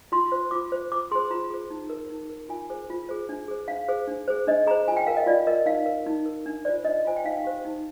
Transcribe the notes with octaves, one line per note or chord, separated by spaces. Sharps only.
F4 C6
C5
F4 D6
C5
F4 D6
G#4 C5 C6
F4 A#5
G#4 C5
D#4
A#4
D#4
A#4
F4 G#5
G#4 C5
F4
G#4 C5
D4
G#4 C5
D4 F5
G#4 C5
D4
G#4 C5
D4 D#5
G#4 C5 A#5
F4 G#5
G5
A#4 F5
D#5
F4 D5
A#4 D#5
D#4 F5
A#4
D#4
A#4
D4
F4 C5 D5
D4 D#5
F4 C5 G#5
G5
D#4 F5
G4 C5
D#4